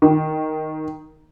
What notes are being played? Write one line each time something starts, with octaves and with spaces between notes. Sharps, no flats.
D#3